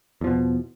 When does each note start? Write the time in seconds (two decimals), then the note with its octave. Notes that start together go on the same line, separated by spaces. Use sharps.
0.21 E2
0.24 F3
0.27 B2